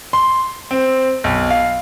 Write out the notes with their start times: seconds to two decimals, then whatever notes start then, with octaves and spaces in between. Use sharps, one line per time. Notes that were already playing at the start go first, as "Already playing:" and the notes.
0.13 C6
0.71 C4
1.24 B1
1.50 F5